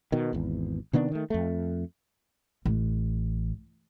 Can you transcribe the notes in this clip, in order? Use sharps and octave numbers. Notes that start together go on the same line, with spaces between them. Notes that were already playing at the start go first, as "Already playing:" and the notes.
B2 D#3
G#1 E2
C3 D#3 B3 D4
D#3 A3
F2 A3
A1